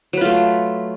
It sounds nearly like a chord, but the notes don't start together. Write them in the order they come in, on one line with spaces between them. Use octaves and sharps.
F#3 B4 F4 A3